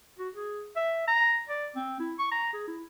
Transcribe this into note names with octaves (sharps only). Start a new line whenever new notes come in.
F#4
G#4
E5
A#5
D5
C4
E4
C#6
A#5
G#4
E4